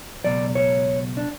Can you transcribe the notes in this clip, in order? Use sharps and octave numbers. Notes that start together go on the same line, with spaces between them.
C#2 B2 F#3 D5
C#5
D4